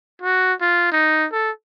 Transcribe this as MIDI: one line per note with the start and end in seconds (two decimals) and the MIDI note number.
0.22 0.53 66
0.61 0.87 65
0.92 1.26 63
1.32 1.51 69